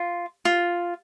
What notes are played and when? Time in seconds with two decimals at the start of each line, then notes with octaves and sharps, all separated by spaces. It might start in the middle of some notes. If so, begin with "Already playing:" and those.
Already playing: F4
0.45 F4